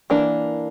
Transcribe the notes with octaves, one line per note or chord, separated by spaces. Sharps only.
E3 A#3 D4